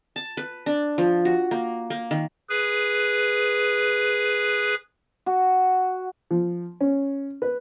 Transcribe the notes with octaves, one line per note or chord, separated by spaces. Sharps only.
A5
B4
D4
F3
F#4
A#3
A#3
D#3
G#4 B4
F#4
F3
C#4
B4